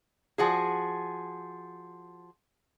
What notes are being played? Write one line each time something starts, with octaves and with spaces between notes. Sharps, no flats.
F3 F#4 G#4